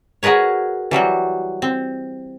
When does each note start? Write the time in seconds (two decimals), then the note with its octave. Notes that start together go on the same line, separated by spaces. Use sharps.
0.23 F#4 G#4 A#4 B4 C#5
0.91 E3 F#3 G3 F#4
1.62 C4